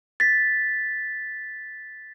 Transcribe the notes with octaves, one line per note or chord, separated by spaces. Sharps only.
A6 B6